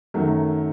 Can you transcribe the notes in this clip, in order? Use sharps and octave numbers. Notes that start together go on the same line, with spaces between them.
F#2 D#3 F#3 A3